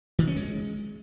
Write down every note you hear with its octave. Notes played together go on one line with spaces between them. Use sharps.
D#3
C#4
G#3